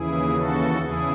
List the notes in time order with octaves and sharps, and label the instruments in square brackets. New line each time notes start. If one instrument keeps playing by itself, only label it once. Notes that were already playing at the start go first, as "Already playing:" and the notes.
Already playing: [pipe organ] D#2 C#3 E3 E4 G#4
F#4 A4
E2 C#3 E3 E4 G#4